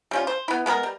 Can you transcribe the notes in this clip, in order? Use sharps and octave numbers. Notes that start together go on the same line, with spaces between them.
G3 C#4 F4
C5
B3 E4
G#3 B3 G#4 A#4
G3